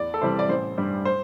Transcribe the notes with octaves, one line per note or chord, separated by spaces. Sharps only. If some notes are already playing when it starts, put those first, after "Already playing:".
Already playing: E2 D5
A4
C3 E3 G3 C5
D5
A1 C5
G2 G3
C5